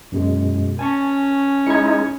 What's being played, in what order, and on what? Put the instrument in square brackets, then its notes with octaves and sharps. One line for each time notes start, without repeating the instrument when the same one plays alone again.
[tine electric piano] F#2 B2 G#3
[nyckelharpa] C#4 [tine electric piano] G#5 A5 C#6
[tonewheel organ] G#3 D#4 E4 [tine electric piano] G#6 C#7